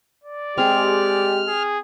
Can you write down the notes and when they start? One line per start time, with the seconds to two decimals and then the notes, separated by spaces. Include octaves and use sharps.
0.24 D5
0.58 G#3 C4 G4 G#4 F6
1.48 G#4